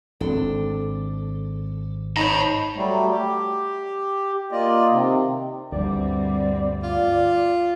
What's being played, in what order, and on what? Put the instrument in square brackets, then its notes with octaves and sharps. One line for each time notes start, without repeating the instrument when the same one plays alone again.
[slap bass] G#1 C4 [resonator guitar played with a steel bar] D4 A4
[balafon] D#4 [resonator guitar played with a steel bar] C5 C#5 D#5 [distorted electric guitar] A5 B5
[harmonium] F#3 G3 A3
G4
A#3 F4 D5 D#5
C3 D#3
[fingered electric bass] D2 G2 [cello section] G3 C4 [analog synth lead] D5
[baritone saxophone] F4